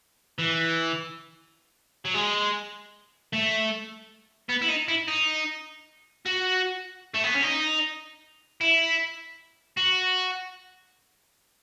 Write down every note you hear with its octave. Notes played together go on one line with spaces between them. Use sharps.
E3
F#3
G#3
A3
B3
E4
D#4
E4
D#4
F#4
A3
B3
C#4
D#4
E4
F#4